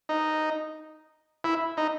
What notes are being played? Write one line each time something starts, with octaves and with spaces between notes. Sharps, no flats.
D#4
E4
D#4